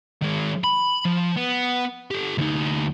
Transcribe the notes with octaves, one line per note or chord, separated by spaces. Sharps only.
D#3 G#3
B5
F3
B3
G4 A4
D2 D#4